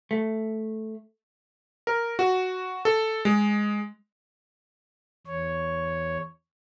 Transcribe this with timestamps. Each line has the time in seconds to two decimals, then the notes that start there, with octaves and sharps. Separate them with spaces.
0.11 A3
1.87 A#4
2.19 F#4
2.85 A4
3.25 G#3
5.27 E2 C#5